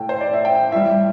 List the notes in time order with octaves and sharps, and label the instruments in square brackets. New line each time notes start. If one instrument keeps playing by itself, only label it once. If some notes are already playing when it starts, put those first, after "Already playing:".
Already playing: [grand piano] A2 A3 G5
C5
D5
E5
G5
A2 G3 E5